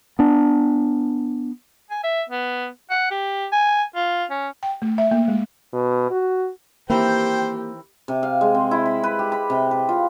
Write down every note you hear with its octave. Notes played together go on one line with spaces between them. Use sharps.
B3 D4
G#5
E5
B3
F#5
G4
G#5
F4
C#4
G5
A3
E5
A#3
G#3
B2
F#4
D#3 E3 A#3 C4 G4 C5 G5
C3
F5
G#3
C4
E4
B5
B4
G4
B5
C3
B4
F4